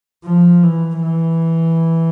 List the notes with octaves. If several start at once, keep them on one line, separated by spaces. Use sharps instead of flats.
F3
E3
E3